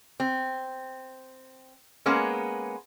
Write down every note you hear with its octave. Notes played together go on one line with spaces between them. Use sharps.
C4
G#3 A#3 B3 C#4